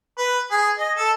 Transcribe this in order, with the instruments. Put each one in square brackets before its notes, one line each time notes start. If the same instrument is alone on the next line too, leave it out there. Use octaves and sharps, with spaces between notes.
[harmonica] B4
G#4
D#5
A4